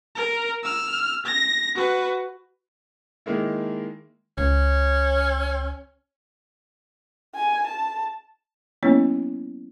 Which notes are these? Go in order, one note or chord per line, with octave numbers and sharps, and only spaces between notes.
A#4
E6 F6
A#6
F#4 B4
D#3 G#3 A#3 E4
C#2 C#4
G#5
A5
F#3 A#3 B3 C#4 E4 C#5